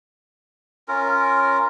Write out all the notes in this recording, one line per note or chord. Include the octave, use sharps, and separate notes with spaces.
C#4 F4 A#4